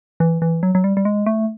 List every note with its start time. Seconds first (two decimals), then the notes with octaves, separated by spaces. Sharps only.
0.20 E3
0.42 E3
0.63 F#3
0.75 F#3
0.84 G3
0.97 G3
1.05 G#3
1.26 A3